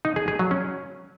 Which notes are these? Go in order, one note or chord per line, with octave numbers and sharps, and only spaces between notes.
D#4
G#4
G#4
F#3
C#4